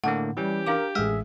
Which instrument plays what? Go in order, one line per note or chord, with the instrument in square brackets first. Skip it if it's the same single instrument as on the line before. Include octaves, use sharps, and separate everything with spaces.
[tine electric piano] A2 D3 A#3 [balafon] F#5
[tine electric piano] E3 C#4 [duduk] G3 [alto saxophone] G4
[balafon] D4 F5 D6 [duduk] A#4
[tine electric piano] A1 E5 [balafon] G#3 [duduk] G#4